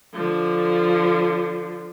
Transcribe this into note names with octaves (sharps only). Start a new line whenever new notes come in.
D3 F3